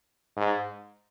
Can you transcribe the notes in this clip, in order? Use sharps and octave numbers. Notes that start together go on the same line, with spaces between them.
G#2